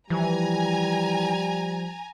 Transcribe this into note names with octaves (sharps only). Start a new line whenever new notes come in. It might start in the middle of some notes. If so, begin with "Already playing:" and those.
E3 F3 G3 G#5 A#5